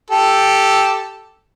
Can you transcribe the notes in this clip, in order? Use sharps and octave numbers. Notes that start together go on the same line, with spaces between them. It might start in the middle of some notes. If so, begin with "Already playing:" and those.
G4 A4